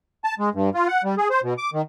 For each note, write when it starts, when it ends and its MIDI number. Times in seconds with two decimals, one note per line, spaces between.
0.24 0.35 81
0.39 0.49 56
0.54 0.70 43
0.75 0.88 65
0.88 1.02 78
1.04 1.15 55
1.17 1.28 68
1.30 1.40 72
1.43 1.54 47
1.58 1.70 86
1.73 1.82 51